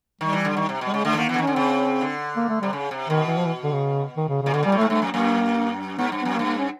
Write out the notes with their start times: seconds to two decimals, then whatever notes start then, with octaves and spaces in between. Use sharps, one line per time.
0.21 D#3 G3
0.33 E3
0.45 D3
0.57 D#3
0.69 C3
0.81 B2
0.87 G3
0.93 C#3 G#3
1.05 D3 A3
1.13 E3
1.17 D#3 A#3
1.29 E3 B3
1.34 D3
1.38 D#3 C#4
1.47 D3
1.53 C#3 C4
2.01 D3
2.37 A#3
2.49 A3
2.62 C3 G3
2.73 C#3
2.91 C3
3.09 B2 D#3
3.28 E3
3.37 F3
3.46 E3
3.64 D3
3.72 C#3
4.17 D#3
4.29 C#3
4.42 C#3
4.46 A#2
4.54 B2 D3
4.63 A#2 G3
4.72 A2
4.78 A3
4.81 G#2
4.89 G2 A3
5.02 F#2
5.08 A#3
5.14 F#2
5.98 G#2 B3
6.12 G2
6.22 F#2 B3
6.34 A#3
6.39 G2
6.46 A#3
6.58 C#4